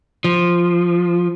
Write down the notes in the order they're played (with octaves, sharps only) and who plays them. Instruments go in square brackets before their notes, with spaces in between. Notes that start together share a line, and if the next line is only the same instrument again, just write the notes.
[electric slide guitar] F3